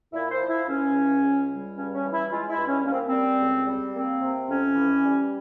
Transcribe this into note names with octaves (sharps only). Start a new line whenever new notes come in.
A#2 E4
C5
F3
E4
C#2 C#4
C#3
C#2
G3
G2 C#4
C#4
E3
E4
G#3 F4
E4
G2
C#4
A#3 C#4
C4
C4
G3
C#2
G3
A#3 C4
C3
F2 C#4
E3
G3